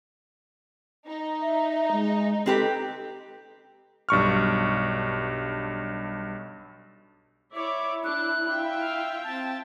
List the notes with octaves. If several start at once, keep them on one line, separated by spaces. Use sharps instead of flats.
D#4
E5
G#3
C4 G4 A4 B4
B1 G2 C#6 F6
E4 C#5 D5 E5 D6
D4 F#6
F4 E5 G5
F5
C4 A5